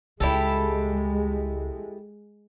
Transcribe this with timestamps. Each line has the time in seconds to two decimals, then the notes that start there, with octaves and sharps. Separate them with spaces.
0.20 C#2 G#3 E4 G4 A4